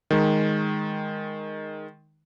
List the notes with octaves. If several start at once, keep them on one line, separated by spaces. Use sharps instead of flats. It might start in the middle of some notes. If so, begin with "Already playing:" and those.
D#3 G#3